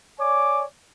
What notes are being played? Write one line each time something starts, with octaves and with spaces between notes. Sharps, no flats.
C#5 D5 G#5 D6